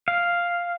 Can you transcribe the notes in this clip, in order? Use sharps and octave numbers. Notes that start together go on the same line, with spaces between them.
F5